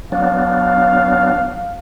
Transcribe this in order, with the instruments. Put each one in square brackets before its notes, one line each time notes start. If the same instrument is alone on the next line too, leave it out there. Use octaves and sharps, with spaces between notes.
[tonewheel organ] F#3 B3 D4 [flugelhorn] F5